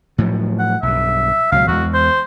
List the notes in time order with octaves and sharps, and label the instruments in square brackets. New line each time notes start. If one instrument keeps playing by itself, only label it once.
[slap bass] A2 F3 F#3
[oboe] F#5
[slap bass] B1 G2 [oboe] E5
[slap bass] C#2 B2 F#3 [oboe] F5
[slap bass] E2 G#3 [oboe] F#4
[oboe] C5